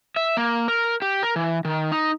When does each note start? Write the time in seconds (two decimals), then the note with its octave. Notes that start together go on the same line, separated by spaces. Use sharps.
0.16 E5
0.37 A#3
0.68 A#4
1.02 G4
1.23 A#4
1.36 E3
1.65 D#3
1.92 D#4